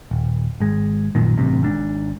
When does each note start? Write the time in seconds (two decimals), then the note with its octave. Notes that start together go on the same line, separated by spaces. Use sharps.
0.11 D#1
0.60 G#1 G#3
1.15 A#1 F#2 A#2 D#3
1.37 A1 G2 C3
1.62 G#1 G#2 D4